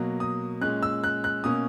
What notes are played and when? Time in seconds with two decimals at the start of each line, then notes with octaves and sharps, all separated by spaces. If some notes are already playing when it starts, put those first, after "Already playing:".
Already playing: B2 F#3 A#3
0.20 D#6
0.61 A#2 G#3 C#4 F#6
0.83 E6
1.04 F#6
1.24 F#6
1.44 B2 A#3 C#4 D#6